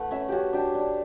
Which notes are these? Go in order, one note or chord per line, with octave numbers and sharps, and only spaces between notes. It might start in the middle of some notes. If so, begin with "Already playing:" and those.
Already playing: A3 E4 B4 F#5
C#4 E5
C#4 F#4 G4
D4 G4
D4